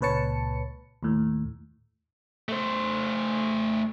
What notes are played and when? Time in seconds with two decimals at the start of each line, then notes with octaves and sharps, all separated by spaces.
0.01 C#2 A#2 B4 C#5 A5 C#7
1.03 D#2 A2
2.49 A3 C5